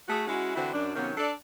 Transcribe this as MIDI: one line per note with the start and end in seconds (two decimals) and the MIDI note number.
0.09 0.26 57
0.09 0.26 66
0.09 0.26 68
0.28 0.55 56
0.28 0.55 61
0.28 0.55 64
0.28 0.55 66
0.55 0.70 50
0.55 0.70 52
0.55 0.70 60
0.55 0.70 64
0.55 0.70 66
0.55 0.70 72
0.74 0.94 42
0.74 0.94 62
0.96 1.12 48
0.96 1.12 51
0.96 1.12 54
0.96 1.12 58
0.96 1.12 59
0.96 1.12 61
1.18 1.32 62
1.18 1.32 69
1.18 1.32 74